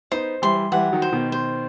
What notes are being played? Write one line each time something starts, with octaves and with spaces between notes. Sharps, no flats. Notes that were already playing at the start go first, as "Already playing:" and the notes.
B3 D#4 C5
E3 G3 C6
E3 G3 F#5
D#3 F#3
C5
B2 D#3
C5